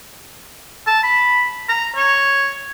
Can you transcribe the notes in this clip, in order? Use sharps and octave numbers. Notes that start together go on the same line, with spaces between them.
A5
B5
A#5
C#5